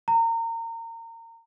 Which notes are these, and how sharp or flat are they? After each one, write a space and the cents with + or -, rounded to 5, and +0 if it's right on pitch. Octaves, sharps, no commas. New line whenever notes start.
A#5 -30